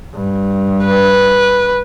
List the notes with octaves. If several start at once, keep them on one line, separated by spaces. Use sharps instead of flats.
G2
B4